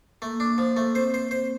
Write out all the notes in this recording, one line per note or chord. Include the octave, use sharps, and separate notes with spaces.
A3 A#3
D4
F3
A3
A#3
C4 C5
C5
C5